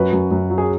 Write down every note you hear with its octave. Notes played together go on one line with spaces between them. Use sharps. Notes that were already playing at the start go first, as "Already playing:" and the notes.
Already playing: F#2 F#4 B4
F#2
F#2
F#3
G#4